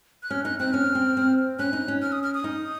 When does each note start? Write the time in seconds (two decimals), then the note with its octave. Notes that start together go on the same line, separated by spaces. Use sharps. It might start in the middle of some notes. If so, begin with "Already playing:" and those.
0.23 F#6
0.31 C#4 F6
0.45 D#4 F#6
0.60 C4 F#6
0.73 C#4 F6
0.95 C4
1.17 C4
1.59 C#4 F#6
1.73 D#4
1.88 C#4
2.02 F6
2.12 D#6
2.24 F6
2.35 D#6
2.44 D#4